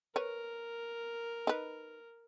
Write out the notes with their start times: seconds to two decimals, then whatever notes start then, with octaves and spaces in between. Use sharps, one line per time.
0.16 A#4 B4 C#5
1.47 D#4 B4